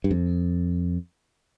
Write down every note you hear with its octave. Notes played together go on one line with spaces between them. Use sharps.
G2
F2